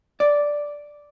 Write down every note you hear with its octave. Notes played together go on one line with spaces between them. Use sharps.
D5